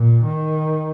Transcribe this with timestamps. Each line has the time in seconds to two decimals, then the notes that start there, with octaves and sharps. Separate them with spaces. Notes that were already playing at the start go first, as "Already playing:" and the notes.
Already playing: A#2
0.25 D#3